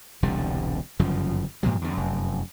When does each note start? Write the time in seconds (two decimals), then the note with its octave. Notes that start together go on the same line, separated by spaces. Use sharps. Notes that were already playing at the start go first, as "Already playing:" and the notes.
0.23 E1 C2 D3 G3
0.99 G1 F#2 C#3 F3
1.63 G2 A#2 F3 F#3
1.82 E2 D3
1.93 F1 F#2